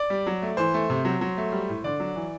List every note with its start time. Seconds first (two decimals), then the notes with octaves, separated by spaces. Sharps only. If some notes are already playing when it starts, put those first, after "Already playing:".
Already playing: D5
0.10 G3
0.27 F#3
0.42 A3
0.57 E3 C5
0.74 A3
0.90 C3
1.05 F#3
1.21 F#3
1.37 A3
1.52 G3
1.69 A2
1.84 D3 D5
2.00 F#3
2.16 E3